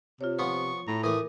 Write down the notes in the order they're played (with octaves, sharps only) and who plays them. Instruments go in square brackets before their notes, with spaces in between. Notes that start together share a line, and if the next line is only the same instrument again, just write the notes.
[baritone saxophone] C3 [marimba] F4 C#5
[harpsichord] F3 B3 [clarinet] C#6
[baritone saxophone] A2 [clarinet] A#5
[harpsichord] E3 A3 [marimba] A#4 D6 [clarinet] D#6